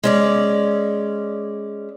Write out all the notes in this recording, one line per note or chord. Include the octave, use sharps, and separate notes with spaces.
G#3 C#4 D5